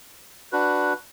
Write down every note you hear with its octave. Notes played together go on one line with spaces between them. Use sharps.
D4 F#4 B4